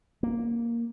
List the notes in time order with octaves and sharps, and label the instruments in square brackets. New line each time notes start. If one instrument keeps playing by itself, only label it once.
[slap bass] A#3